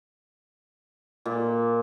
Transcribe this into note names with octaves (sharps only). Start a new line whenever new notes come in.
A#2